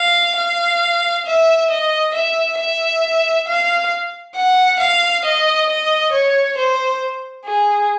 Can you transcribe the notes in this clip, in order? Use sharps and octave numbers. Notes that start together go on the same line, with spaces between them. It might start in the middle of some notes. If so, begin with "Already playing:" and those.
Already playing: F5
F5
E5
D#5
E5
E5
F5
F#5
F5
D#5
D#5
C#5
C5
G#4